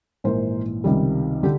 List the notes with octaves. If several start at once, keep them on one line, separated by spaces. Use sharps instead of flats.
A#1 G#2 E3 A#4 C5
C#2 C3 D#3 G3
D3 G4